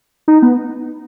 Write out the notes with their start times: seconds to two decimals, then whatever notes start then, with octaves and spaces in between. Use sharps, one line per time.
0.28 D#4
0.42 B3